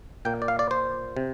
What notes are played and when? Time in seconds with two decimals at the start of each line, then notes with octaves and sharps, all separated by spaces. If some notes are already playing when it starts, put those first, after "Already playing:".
0.25 A#2 A#3 G5
0.42 D5
0.48 F5
0.59 D5
0.71 C5
1.17 C3